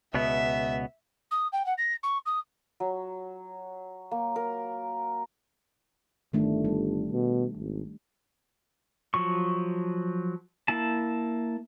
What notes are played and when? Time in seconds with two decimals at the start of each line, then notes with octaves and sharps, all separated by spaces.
0.14 C#2 B2 B3 E5
1.31 D#6
1.53 G5
1.66 F#5
1.78 A#6
2.03 C#6
2.26 D#6
2.80 F#3
4.11 A#3
4.36 A#4
6.33 G1 D#3 A3 D4
6.65 G3
7.11 B2
7.57 G#1
9.14 F3 F#3 C#6
10.68 A#3 E4 A5